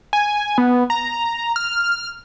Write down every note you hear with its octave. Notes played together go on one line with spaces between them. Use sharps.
G#5
B3
A#5
F6